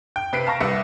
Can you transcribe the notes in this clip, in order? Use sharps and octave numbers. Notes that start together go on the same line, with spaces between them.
G5
C3 B4 B6 C7 D7
F5 A5 A#5 C#6 A#6
C2 G3 B4 E5 C#7